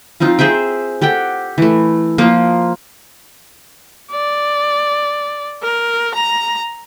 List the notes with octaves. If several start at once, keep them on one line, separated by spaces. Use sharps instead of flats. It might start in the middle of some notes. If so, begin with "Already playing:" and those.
F3 C4 D#4 F4
G#4 C5 E5 G5
G4 A4 F#5 G5
E3 A3
F3 A#3 F4
D5
A#4
A#5